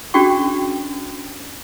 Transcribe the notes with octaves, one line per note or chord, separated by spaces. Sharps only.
C#4 D4 F#4 G#4 G5 C#6